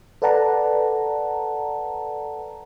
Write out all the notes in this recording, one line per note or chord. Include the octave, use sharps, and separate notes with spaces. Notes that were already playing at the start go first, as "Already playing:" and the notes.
A4 B4 D5 F#5 A5 A#5